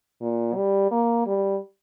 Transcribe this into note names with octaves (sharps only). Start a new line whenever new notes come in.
A#2
G3
A#3
G3